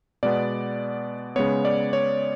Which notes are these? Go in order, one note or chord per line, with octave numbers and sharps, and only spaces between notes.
B2 G#3 B3 D5
C#3 G#3 B3 C#5
D5
C#5